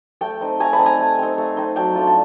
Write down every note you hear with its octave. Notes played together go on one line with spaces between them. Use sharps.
A3 G5 A5
C4 D#4
A3 G#5 A#5
A5 B5
C4 D#4
G#5 A#5
A3
C4 D#4
A3
C4 D#4
F#3 G5 A5
A3 D4 F4
A5